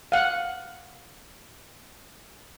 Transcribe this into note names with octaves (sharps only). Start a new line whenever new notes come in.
F5 F#5